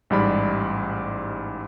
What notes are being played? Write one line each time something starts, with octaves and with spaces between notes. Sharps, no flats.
A1 G#2 G3 D5 B5